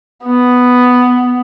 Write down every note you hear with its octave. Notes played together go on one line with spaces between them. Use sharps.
B3